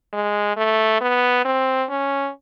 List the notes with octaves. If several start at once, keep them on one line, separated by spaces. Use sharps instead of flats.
G#3
A3
B3
C4
C#4